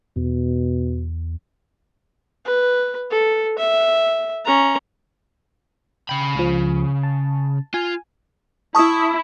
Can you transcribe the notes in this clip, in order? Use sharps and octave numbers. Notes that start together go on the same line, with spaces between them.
E2 B2
B4
A4
E5
C#4 A#5
C#3 G5 B5
C#2 F3
A5
F4 G#5
E4 A5 C#6 D#6